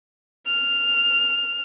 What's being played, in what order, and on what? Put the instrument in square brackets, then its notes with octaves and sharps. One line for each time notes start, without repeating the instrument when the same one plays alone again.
[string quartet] F6